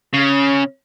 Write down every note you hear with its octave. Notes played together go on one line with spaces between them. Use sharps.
C#3